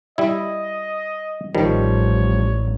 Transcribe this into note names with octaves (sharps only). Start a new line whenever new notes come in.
G3 E4 D#5
A1 D#3 F3 G3 C#5